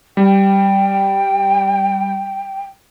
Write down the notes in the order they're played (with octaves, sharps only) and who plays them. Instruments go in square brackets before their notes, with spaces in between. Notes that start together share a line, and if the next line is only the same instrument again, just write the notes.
[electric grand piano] G3 [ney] G5